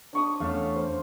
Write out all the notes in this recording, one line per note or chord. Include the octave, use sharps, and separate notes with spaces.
D4 C#6 D#6
E2 A3 C#4 F5
C5